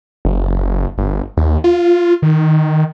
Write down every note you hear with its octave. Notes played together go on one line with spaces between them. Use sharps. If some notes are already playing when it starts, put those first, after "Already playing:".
F#1
G1
D#2
F4
D#3